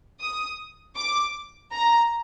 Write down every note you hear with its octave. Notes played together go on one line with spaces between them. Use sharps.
D#6
D6
A#5